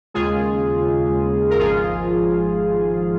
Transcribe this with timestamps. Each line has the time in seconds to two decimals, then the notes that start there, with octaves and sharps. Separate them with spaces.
0.14 D#2 C#3 G#3 F4 G#4
1.50 A#4
1.59 G#1 G#2 F3 F4 G#4